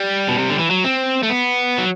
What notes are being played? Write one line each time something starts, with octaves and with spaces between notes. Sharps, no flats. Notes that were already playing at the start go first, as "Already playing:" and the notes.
Already playing: G3
B2
C3
D3
E3
F#3
C4
A3
B3
F#3